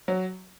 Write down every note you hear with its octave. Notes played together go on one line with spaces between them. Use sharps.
F#3